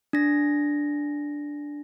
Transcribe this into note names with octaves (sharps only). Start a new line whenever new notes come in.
D4 A#6